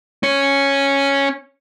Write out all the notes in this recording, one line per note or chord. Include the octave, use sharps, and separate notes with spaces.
C#4 C#5